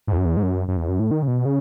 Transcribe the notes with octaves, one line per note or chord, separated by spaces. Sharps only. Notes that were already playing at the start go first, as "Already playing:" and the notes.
G#2
E2
F#2
E2
G#2
F#2
F#2
E2
F#2
A2
D#3
C#3
B2
C#3